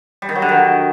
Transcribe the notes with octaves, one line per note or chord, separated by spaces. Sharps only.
G3
D#3
F#3
D3
D#3